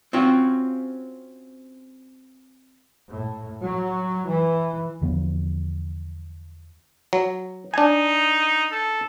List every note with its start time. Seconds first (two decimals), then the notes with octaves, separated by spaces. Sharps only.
0.13 C4 C#4 F4 F#4
3.12 A2
3.62 F#3
4.27 E3
5.02 E2 D3 F3 B3
7.13 F#3
7.74 D4 D#4 G#5
8.72 A4